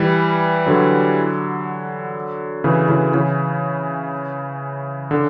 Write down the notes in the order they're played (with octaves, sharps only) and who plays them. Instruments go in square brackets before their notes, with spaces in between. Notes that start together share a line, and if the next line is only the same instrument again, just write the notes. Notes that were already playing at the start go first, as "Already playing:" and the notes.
Already playing: [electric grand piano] E3 G3
D3 F#3
C#3 E3
C#3 E3
C#3 E3
D3